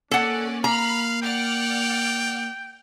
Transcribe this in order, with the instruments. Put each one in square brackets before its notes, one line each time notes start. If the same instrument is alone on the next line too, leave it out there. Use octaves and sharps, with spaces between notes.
[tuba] A#3 [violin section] C#4 D5 [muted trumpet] D4 [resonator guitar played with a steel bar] A4 F#5
[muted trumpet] F5 [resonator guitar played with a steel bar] A#5 [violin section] B5 F6
[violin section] D5 F#5 F6 [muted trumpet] G5